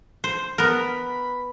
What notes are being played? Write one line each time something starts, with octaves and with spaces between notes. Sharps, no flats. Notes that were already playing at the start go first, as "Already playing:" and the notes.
C5
B3 A#4 B5